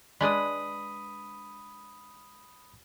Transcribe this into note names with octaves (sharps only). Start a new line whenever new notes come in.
G#3 D4 B4 B5 D#6